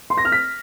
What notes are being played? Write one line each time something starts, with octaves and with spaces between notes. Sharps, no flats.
C6
A#6
F6
B6